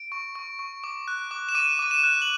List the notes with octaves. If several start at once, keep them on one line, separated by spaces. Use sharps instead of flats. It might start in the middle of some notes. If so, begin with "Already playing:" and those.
Already playing: D7
C#6
C#6
C#6
D6
F#6
D6
E7
D6 D#7
D6 D#7
E7
F#6
F#7